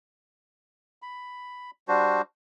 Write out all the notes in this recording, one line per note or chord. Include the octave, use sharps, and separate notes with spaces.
B5
G3 D4 F#4 C5